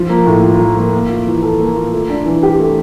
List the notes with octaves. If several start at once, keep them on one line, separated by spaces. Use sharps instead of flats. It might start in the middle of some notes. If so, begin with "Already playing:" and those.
Already playing: F3
A#3
A2
F4
F3
A#3
A#3
F4
E3
A4
A#3
F4
A3
D4
E3
G4
A3